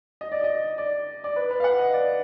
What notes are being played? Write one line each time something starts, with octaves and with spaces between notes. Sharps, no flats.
D#5
D5
D#5
D5
D5
B4
B4
F5
F#5
D#5
D5